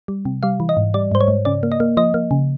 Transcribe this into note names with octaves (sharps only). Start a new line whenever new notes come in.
G3
C3
G3 F5
E3
D#5
G#2
G3 D5
G#2 C5
C#5
G#2
C#3 D5
A#3
D#5
A#3
F3 D#5
A#3
C#3